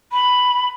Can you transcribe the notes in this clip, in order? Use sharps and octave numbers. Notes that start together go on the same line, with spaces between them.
B5